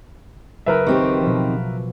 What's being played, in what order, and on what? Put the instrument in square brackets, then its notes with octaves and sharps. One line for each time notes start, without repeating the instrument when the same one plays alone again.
[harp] F#1 [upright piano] A#4 B4 E5
[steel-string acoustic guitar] D#3 C4 G4 [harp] C#6 D6
[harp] B2 F3